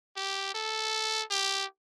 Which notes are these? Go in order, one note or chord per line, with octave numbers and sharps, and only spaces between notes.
G4
A4
G4